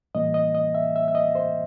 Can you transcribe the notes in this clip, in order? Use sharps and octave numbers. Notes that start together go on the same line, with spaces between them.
A2 E3 G3 A#3 D#5
D#5
D#5
E5
E5
E5
D#5
C5